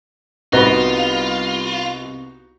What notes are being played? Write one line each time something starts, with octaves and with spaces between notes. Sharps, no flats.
C2 B3 D#4 F4 F#4 D#5 B5